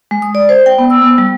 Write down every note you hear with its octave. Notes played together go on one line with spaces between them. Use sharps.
G#3
D#6
D5
C5
G5
B3
E6
B3
G3